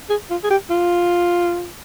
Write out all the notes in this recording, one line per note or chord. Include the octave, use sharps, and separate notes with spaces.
G#4
F4
G#4
G4
F4